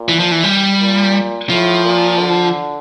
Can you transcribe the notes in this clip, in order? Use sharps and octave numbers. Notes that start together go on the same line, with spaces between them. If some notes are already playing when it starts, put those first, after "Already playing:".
Already playing: A#2
E3
F3
E3
G3
A#2
A2 F3
A#2
D3